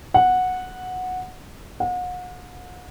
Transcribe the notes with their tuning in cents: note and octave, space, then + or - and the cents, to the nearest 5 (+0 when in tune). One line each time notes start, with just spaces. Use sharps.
F#5 -10
F#5 -40